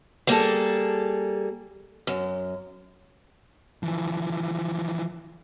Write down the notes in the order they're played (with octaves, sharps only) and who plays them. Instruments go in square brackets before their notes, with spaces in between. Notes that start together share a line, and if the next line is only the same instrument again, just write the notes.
[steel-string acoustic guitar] G3 A#3 G#4 A4
F#2
[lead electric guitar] E3 F3